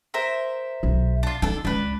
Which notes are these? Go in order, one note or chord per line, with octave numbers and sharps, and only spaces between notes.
A#4 C5 E5
B1
D4 F4
D4 D#4 A4
C#2 D4 B4